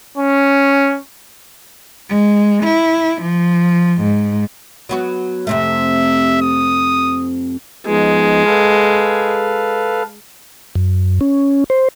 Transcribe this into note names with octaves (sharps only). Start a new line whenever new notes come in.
C#4
G#3
E4
F3
G#2
F#3 B3 F#4
F2 C3 A3 E5
D#6
F3 G#3 B3 D#4
A4 B4 F5
F#2
C#4
C5